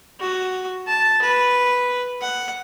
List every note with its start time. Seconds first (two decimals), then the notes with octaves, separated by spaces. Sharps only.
0.20 F#4
0.87 A5
1.22 B4
2.21 F#5